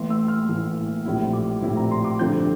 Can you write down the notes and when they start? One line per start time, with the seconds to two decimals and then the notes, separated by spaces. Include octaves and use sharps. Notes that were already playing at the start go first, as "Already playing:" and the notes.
Already playing: A1 A2 E3 A#3 C6
0.10 E6
0.28 F6
0.48 A1 A2 E3 A#3
1.05 A#1 A2 G3 C4 E4
1.33 D6
1.62 A#1 A2 G3 C4 E4
1.77 A#5
1.91 C6
2.04 D6
2.19 G2 D3 F3 C4 G6